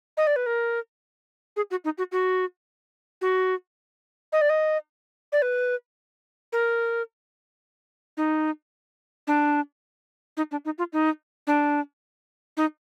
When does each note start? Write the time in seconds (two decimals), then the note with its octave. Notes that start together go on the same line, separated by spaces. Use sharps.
0.17 D#5
0.27 D5
0.36 B4
0.46 A#4
1.56 G#4
1.71 F#4
1.85 D#4
1.98 F#4
2.12 F#4
3.21 F#4
4.32 D#5
4.41 D5
4.50 D#5
5.32 D5
5.42 B4
6.53 A#4
8.17 D#4
9.27 D4
10.37 D#4
10.51 D4
10.65 D#4
10.78 F4
10.93 D#4
11.47 D4
12.57 D#4